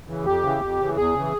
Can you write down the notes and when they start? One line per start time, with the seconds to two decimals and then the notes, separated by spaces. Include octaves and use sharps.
0.08 C#3 E3
0.25 F2 G4
0.43 C#3 E3
0.61 F2
0.79 C#3 E3
0.96 E2 G#4
1.14 C#3 E3